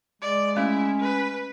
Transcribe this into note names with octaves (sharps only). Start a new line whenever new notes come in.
G#3 D5
A3 C#4 E4
B4